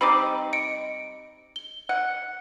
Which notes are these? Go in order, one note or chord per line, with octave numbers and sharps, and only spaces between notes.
G3 C4 D#4 B5 D6
D#5 C#7 D7
G7
F#5